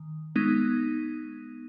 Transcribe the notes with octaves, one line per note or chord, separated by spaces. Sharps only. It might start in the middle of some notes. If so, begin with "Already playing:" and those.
Already playing: D#3
G#3 B3 D#4